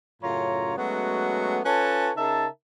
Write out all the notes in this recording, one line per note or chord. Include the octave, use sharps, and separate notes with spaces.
F#2 A2 C#3 F4 C#5 A#5
F#3 G#3 A3 B3 C#4 F#4
C#4 F4 A4 B4 C#5 A5
C#3 D#4 A#4 E5 A5